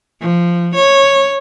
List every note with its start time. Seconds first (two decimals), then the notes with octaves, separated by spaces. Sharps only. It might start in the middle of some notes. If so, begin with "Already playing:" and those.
0.21 F3
0.75 C#5